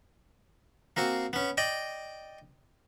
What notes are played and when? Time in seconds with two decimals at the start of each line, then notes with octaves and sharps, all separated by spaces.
0.97 A#3 C4 F#4
1.33 B3 C#4
1.57 D5 D#5 G5